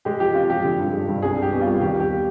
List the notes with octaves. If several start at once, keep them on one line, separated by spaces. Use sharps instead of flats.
G#3 G4
F3 G4
F2 F4
F3 G4
D3
G2
G#3
G2
C2 G#4
G3
G4
B2
F4
C2
D#2 G4
D#2 G4